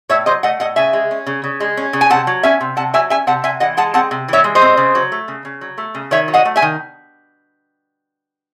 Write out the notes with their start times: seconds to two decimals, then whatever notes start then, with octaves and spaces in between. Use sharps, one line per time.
0.09 A2 C#5 E5
0.26 F#3 C5 D#5
0.43 A3 D#5 F#5
0.60 A2 D#5 F#5
0.76 C#3 E5 G#5
0.93 G#3
1.11 C#4
1.26 C#3
1.44 C#3
1.60 G#3
1.77 C#4
1.93 C#3
2.01 G#5
2.10 C3 F#5 A5
2.27 F#3
2.43 C#4 E5 G#5
2.61 C3
2.77 C3 F#5 A5
2.94 F#3 E5 G#5
3.10 C#4 E5 G#5
3.27 C3 F#5 A5
3.44 C3 E5 G#5
3.60 E3 D#5 F#5
3.77 G#3 F#5 A5
3.94 C4 F#5 A5
4.11 C3
4.28 E3 C#5 E5
4.44 G#3
4.55 C5 D#5
4.62 C4
4.77 C#3
4.95 F#3
5.12 A3
5.28 C#3
5.45 C#3
5.61 F#3
5.78 A3
5.95 C#3
6.11 D#3 C#5 E5
6.28 F#3
6.34 D#5 F#5
6.45 A3
6.56 E5 G#5
6.62 D#3